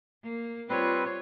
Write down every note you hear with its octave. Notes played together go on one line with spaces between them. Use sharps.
A#3
G3 C4 F4 B4 C#5